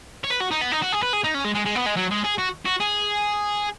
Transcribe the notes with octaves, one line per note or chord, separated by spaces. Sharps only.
C#5
B4
F#4
D#4
B3
D#4
F#4
G#4
B4
G#4
D#4
C#4
G#3
G#3
G#3
B3
G#3
F#3
G#3
G#4
F#4
F#4
G#4